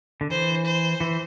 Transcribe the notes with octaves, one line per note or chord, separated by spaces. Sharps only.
D3
E3 C5
C5
E3